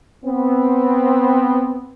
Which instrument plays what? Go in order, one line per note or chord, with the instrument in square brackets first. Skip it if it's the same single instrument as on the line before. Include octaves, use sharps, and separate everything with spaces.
[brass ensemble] B3 C4